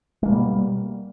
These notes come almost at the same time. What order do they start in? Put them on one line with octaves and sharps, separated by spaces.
G#3 A#3 B2 G3